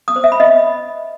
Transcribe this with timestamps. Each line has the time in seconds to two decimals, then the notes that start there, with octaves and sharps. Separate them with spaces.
0.08 D#6
0.16 C5
0.24 E5
0.32 B5
0.40 D#5